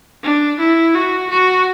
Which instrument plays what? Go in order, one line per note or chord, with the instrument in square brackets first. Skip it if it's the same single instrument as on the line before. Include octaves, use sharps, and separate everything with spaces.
[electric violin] D4
E4
F#4
F#4